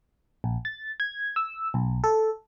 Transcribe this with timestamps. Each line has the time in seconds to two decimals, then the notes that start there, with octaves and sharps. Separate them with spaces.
0.44 A#1
0.65 A6
1.00 G#6
1.36 E6
1.74 B1
2.04 A4